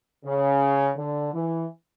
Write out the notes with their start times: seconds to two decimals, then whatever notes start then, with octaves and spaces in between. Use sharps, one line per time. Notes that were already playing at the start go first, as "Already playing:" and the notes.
0.25 C#3
0.97 D3
1.34 E3